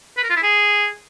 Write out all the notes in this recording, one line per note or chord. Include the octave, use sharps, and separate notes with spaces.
B4
A#4
F4
E4
G#4